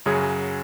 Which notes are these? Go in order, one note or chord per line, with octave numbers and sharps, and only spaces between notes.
F#2 C#3 F#3 C#4 G#4